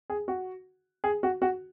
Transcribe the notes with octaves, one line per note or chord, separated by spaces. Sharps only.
G#4
F#4
G#4
F#4
F#4